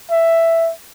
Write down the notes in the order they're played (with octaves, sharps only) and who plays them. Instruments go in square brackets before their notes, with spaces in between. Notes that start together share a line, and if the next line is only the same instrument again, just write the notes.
[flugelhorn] E5